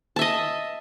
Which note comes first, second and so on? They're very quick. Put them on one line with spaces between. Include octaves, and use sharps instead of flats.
A5 E5 D#5